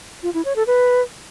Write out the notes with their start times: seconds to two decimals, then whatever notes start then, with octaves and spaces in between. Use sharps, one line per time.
0.23 F4
0.34 E4
0.45 C#5
0.56 A4
0.67 B4